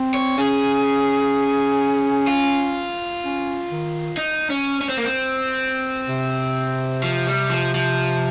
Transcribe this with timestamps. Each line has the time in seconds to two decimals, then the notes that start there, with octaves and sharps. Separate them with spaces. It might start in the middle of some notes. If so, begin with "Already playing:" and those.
Already playing: C4
0.14 C#5
0.38 C#4 G#4
2.27 F4
3.23 C#4
3.70 D#3
4.17 D#4
4.50 C#4
4.81 C#4
4.89 C4
4.97 A#3
5.05 C4
6.08 C3
7.04 F3
7.27 G3
7.50 F3
7.75 F3